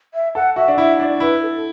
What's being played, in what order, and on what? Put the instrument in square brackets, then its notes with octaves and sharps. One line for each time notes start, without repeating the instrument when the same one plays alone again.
[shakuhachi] E5
[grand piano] A4 [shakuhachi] F#5
[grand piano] F#4 [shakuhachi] E5
[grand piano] D4
[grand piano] E4 [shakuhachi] E5
[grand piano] D4 [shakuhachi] D5
[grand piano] E4 [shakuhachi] B4
[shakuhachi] A4